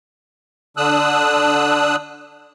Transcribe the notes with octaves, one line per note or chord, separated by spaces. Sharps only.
D3 D4 D#6 E6 F#6